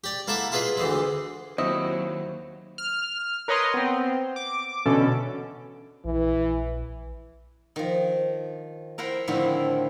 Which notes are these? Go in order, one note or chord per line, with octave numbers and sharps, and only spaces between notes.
G4 D5
A#3 E4 A4 E5 F#5
E4 F4 G#4 B4 D#5
D2 E3 G#3
D#2 F#3 C4 E4 D#5
F6
A#4 B4 C#5 D#5 A#5 C6
B3 C4
D6
B2 D3 E3 C#4 A4
A#1 E3
D#3 F3
E4 A#4 C5 F#5 G5
A2 D3 D#3 F3 C4 E4